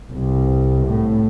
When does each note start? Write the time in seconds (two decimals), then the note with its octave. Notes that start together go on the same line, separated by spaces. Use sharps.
0.12 C2
0.87 A2